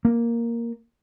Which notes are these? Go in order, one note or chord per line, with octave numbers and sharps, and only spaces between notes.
A#3